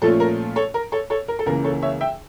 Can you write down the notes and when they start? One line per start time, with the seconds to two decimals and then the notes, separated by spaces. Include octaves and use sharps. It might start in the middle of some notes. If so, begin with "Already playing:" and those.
0.02 A#2 F3 A3 C#4 F4 A4
0.20 A#4
0.56 A4 C#5
0.74 A#4
0.92 A4 C#5
1.10 A4 C#5
1.28 A#4
1.39 A4
1.46 C#2 C#3 E3 A#3 A#4
1.64 A4 C#5
1.82 C#5 E5
2.01 E5 G5